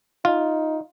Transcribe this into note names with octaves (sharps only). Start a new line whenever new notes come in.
D#4 F4